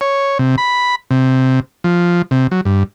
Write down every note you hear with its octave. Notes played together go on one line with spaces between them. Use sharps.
C#5
C3
B5
C3
F3
C3
F#3
G2